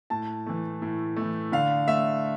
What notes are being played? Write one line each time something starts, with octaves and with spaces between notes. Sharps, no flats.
A2 A5
E3 A3
A2
E3 A3
D3 F5
A3 E5